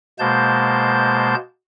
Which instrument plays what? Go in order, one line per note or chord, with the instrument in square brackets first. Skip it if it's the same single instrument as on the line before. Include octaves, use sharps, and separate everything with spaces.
[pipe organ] B2 G#3 A#3 C5 A5 G6